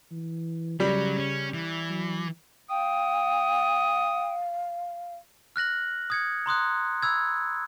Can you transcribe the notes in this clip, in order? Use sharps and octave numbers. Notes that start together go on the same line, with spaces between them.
E3
C#3 F#3 G3
C#4
E3
F#3
F5 G5 D#6
F6 F#6 A#6 F#7
D#6 G#6 C#7
A#5 C6 D#6 F#6
B5 E6 G#6